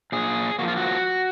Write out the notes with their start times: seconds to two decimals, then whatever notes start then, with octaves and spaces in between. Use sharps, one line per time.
0.12 A#2 G#4
0.59 F3 A#3 F#4
0.68 F4
0.77 F#4